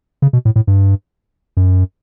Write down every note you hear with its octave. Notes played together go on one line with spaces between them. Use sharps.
C#3
B2
A2
A2
G2
F#2